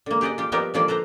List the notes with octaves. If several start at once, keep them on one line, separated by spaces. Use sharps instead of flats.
D3 A#3
G4 G#4 D5 D#5 F#5
F4 G4
D#3 F3 G3 B3 G4 A#4
D3 D#3 F3 A#3 F4 D5
A4 B4 C5 A#5